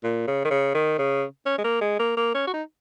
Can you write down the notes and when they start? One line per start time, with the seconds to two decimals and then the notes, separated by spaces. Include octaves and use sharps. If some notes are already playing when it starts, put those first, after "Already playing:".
0.04 A#2
0.27 C#3
0.45 D#3
0.51 C#3
0.75 D#3
0.99 C#3
1.46 C#4
1.58 G#3
1.64 A#3
1.81 G#3
1.99 A#3
2.17 A#3
2.35 C#4
2.47 F#4
2.54 D#4